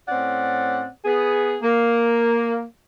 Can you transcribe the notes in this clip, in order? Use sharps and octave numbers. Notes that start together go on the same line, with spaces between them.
A2 C4 C#4 D5 F#5
B3 G#4
A#3